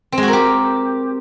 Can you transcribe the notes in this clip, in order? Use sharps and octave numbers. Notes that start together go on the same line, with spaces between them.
C4
G#3
F#4
A#4
G4